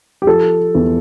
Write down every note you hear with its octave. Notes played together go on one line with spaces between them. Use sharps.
G4
F3 A4
E2